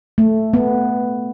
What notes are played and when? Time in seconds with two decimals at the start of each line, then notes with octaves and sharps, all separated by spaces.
0.18 A3
0.54 B3